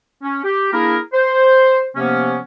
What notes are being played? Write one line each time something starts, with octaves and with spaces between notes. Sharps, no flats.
C#4
G4
A#3 D4 E4 G#4 A#4
C5
C3 F3 A#3 B3 C#4